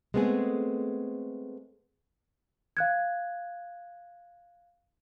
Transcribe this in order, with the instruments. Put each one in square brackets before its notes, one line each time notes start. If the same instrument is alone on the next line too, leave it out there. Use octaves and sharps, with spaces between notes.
[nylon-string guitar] G#3 A3 B3 C4 G#4
[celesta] F5 F#6 G#6